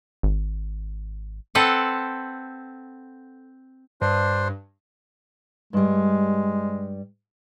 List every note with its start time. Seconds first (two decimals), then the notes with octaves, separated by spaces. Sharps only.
0.23 G#1
1.55 C4 A4 B4 F#5
4.01 G2 D4 C5
5.73 G2 G3 G#3